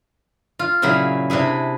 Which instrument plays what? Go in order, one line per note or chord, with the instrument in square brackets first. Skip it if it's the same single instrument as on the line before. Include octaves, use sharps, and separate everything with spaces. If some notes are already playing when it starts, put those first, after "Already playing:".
[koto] F4
A#2 C#3 F#3 E4 G#4
C3 D4 E4 G#4